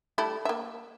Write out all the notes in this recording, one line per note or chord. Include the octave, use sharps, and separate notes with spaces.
G3 A3 E4
A#3 E5